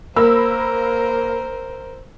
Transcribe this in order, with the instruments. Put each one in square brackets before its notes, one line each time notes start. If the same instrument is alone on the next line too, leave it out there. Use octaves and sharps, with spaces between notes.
[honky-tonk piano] A#3 B5 E6 [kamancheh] A#4 C5